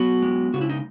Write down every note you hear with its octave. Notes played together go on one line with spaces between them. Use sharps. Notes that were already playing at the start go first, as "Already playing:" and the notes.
Already playing: F#3 B3 F#4
G#3
C#3 F#4
E4
D#4